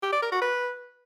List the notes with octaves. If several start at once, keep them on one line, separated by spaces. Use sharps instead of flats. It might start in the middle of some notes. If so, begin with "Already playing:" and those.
G4
D5
A#4
F#4
B4